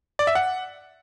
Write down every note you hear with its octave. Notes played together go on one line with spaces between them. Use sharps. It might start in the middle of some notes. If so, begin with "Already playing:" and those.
D5
E5
F#5